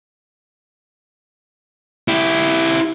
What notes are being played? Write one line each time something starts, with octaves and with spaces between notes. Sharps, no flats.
E4 G4